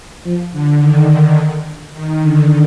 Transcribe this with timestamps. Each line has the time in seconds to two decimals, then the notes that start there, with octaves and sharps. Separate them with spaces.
0.24 F3
0.52 D3
0.80 D#3
1.94 D#3
2.21 D3